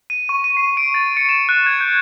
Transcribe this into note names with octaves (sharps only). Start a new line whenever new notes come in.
D#7
C#6
D#7
C7
D7
A6
C#7
E7
F#6
G#6
G6